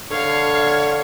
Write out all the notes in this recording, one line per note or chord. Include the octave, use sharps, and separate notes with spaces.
D3 C#5 F5